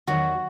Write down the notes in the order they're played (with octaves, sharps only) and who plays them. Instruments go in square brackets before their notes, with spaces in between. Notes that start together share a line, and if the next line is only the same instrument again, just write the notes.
[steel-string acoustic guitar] E2 D#3 F#3 [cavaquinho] F#4